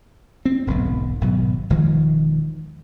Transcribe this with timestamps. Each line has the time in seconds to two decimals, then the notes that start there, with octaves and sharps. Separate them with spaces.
0.45 C4
0.67 D1 B1 G#2 B2
1.21 G#1 B2 F#3
1.70 E1 D#3 F3 G#3